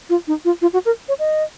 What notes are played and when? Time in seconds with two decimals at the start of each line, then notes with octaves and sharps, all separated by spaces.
0.09 F4
0.27 D#4
0.45 F4
0.62 F4
0.73 F#4
0.85 A#4
1.08 C#5
1.19 D#5